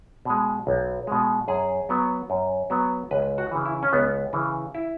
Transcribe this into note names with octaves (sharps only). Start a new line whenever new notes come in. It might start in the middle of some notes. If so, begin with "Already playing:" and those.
B2 G#3
B1
B2 G#3
F#2 G#4
F#3 B3
F#2
F#3 B3
C#2 B4
F#4
C#3 E3
E4
C#4
C#2 B3
C#3 E3
E4